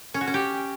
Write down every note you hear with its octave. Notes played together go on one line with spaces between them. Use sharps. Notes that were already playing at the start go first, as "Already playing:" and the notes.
C#4
F#4
C#4
G4